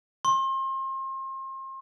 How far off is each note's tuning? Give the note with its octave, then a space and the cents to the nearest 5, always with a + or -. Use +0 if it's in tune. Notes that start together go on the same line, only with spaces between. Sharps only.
C6 +35